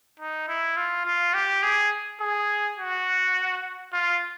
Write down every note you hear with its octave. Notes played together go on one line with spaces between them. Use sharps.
D#4
E4
F4
F4
G4
G#4
G#4
F#4
F4